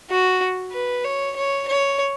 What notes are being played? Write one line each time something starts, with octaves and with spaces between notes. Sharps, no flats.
F#4
B4
C#5
C#5
C#5